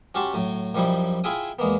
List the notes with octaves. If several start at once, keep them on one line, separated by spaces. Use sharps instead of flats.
C#4 F#4 G4 F#5 A5 C6
A2 F#3
F#2 F3 G3 D#4 E4
E4 F4 G#4 E5 G5 D#6
E2 G#3 A#3 B3